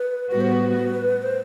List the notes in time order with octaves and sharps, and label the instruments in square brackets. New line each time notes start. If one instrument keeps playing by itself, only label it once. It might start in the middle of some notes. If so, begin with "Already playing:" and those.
Already playing: [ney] B4
[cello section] A2 G3 B3 F#4 [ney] B4
[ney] C5
B4
C5